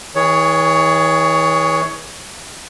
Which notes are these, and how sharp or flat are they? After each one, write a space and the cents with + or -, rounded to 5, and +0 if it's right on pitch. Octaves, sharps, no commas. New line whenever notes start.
E3 -40 G#4 -5 C#5 +15